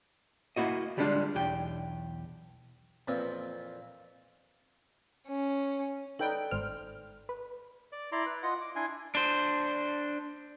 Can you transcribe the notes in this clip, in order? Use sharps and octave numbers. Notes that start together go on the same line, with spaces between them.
A#3 E4 F#4 D#5
D3 G3 G#3 A#3 D4 F4
B1 E2 G4 G5
F2 A#2 E3 C4 F4
C#4
D#4 A4 B4 D5 G5
G#1 C5 F6
B4
D5
E4 D5 A#5 C6
B4
F4 D#5 F#5
D6
D4 E4 G#5 C6
D4 C5